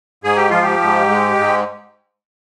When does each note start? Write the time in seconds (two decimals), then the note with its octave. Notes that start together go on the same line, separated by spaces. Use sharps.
0.24 G#2 G#4
0.37 G4
0.50 F3 F4
0.62 G4
0.81 G#2
1.10 G#3
1.39 G#2